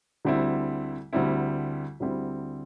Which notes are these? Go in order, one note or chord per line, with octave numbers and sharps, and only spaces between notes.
D2 D3 G3 C4 E4
D2 D3 G3 C4 E4
D2 D3 G3 C4 E4